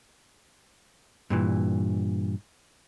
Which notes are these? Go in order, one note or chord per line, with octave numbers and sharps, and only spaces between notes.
G2 A#2 E3